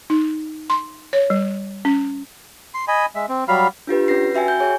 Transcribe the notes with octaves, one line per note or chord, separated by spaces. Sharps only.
D#4
C6
C#5
G3
C#4
C6
D#5 G#5 B5
G#3 E5
C4
F#3 G3 F5 B5
D4 F4 G4 B4
C#4 B4 A#6 C7
F#4 E5 G5 G#5
G6
G#4 C#5 G#5